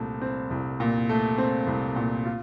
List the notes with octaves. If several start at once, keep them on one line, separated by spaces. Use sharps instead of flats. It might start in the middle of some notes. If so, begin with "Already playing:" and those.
Already playing: C2 A#2 A3 C4
C4
C2
A#2
A3
C4
C2
A#2
F4